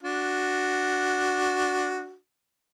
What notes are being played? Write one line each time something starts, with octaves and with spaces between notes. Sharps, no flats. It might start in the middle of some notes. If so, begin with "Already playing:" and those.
D4 F#4